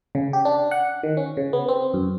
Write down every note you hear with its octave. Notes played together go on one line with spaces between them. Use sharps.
C#3
G4
D4
F#5
D#3
C#4
C#3
B3
C4
F#2